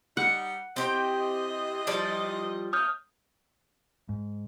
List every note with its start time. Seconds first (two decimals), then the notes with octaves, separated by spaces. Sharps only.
0.17 G3 D#4 F#5
0.76 E3 C4 G4 C5 D#5 G5
1.87 F3 G3 D5
2.73 A3 A#3 C#5 D#6 F6 G6
4.09 G#2